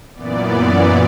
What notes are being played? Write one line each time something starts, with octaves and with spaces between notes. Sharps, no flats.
F#2 A#2 E3 B3 D5